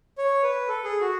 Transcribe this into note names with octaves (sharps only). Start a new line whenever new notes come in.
C#5
B4
A4
G#4
F#4